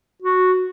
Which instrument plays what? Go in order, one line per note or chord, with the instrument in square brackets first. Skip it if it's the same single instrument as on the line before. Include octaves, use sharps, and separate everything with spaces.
[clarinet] F#4